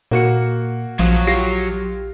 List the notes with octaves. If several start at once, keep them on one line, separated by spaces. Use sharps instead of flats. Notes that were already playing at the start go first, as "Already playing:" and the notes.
A#2 A#3 F#4 C#7
A#1 F3 F#3 C#5 F5 D#6
F4 G4 A#6 C7